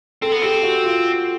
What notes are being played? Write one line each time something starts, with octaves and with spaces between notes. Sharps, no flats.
C4 A4
B3
C4 G4
F#4
F4